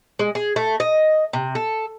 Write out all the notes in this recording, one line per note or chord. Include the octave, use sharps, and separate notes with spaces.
G#3
G#4
A3
D#5
C3
A4